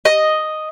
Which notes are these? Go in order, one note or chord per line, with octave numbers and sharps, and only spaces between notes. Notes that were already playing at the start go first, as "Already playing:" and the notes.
D#5